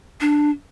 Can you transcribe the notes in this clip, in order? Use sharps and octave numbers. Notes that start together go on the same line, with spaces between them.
D4